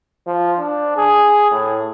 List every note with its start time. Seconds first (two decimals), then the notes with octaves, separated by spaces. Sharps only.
0.27 F3
0.59 D4
0.97 G#4
1.51 A2